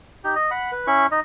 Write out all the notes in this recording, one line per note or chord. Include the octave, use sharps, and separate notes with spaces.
D#4 G4
D#5
F#5 B5
B4
C#4 E4 B5 C#6
D#4 D#5